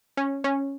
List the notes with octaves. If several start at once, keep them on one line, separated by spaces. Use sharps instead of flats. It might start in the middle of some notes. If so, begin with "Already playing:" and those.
C#4
C#4